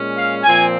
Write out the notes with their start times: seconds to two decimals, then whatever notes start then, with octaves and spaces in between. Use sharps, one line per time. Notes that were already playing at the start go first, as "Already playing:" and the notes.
Already playing: A#2 G#3 C#4
0.16 F5
0.44 A#2 F3 C4 G#5